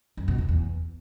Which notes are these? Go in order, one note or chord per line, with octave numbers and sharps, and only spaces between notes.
F#2
B2
E2
E2